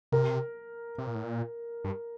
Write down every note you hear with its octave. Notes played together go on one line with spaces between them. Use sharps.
C3 A#4
C3
A#2
A2
A#2
G2